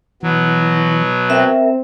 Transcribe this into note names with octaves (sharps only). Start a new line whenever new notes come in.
B2 E3 F#3
C4 A#4 E5